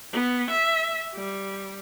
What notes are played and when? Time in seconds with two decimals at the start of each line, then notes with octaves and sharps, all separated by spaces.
0.13 B3
0.51 E5
1.15 G3